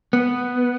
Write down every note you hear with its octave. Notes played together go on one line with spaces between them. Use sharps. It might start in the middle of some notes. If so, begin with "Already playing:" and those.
B3